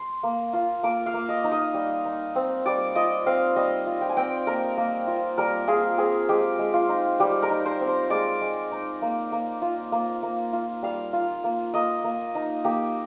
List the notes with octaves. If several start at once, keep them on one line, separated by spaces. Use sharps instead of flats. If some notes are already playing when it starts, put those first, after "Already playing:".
Already playing: C6
A#3
F4
A#3 D6
F5
A#3
D#5
D#4
D#5
G3
D#4
C4
G3 D5
F4 D#5
C4 F5
G3 D#5
F4
G5
G#5
C4 G5
A#3 A#4
A#3
F4
G3 A#4
F4 G#4
C4 G#4
G#3 G4
G#3
F4
D#4
G3 G4
A#4
D#4
C5
C4
C5
G#3 D5
G#3
D#4
A#3
A#3
F4
A#3
A#3
F4
G3 F5
F4
A#3
A#3 D#5
A#3
D#4
A#3 G4